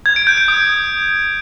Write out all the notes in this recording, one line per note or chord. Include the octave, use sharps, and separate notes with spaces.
G#6
D7
G6
D7
D#6